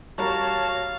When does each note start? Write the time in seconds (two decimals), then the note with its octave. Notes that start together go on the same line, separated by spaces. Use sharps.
0.18 G3 F#4 A#4 C#5 F5 A5